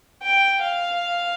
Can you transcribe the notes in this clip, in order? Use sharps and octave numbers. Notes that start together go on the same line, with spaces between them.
G5
F5